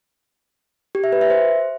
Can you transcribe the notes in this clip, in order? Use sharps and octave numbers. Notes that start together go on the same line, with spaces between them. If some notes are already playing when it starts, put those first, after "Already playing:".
G4
E5
B4
E5
C5